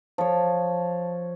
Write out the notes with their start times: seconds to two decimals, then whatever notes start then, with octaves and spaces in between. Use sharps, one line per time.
0.18 F3 C#5